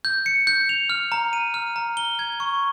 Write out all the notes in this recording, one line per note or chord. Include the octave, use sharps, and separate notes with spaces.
G6
C#7
G6
F7
F6
A#5
D#7
F6
A#5
G7
G#6
C#6